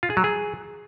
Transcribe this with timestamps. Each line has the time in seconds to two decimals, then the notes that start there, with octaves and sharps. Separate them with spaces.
0.03 F4
0.10 G#4
0.17 F#3
0.24 G#4